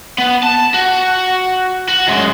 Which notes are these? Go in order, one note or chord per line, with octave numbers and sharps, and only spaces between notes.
B3
A5
F#4
F#4
F#2 G#3